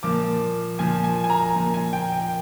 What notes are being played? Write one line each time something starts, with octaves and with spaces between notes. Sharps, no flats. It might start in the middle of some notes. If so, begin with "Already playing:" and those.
A#2 F3 A#3 D6
A#2 F3 A#3 G#5
G#5
G#5
A#5
A#2 F3 A#3
G#5
G5
G5